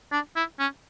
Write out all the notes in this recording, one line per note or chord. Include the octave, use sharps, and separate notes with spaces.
D4
E4
C#4